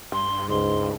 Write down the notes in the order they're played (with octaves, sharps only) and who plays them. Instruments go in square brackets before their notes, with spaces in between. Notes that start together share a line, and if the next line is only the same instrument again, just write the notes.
[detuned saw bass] G2 [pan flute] C6
[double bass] C#2 [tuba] G#2 [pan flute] C6